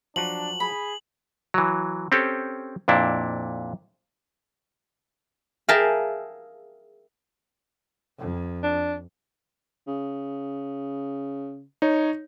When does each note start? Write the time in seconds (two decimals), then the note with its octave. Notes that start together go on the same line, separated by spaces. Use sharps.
0.16 F3 F#3 D4 F#4 F#7
0.60 G#4 B5
1.54 E3 F#3
2.12 C4 C#4 G4 A4
2.88 F2 A#2 D4 E4
5.69 G#4 A#4 E5 F5 G5 A5
8.19 F2
8.63 D4
9.87 C#3
11.82 D#4 C#5